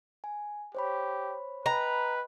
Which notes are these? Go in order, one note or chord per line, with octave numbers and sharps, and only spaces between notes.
G#5
G4 C5 C#5 B5
B4 D#5 G5 A#5 B5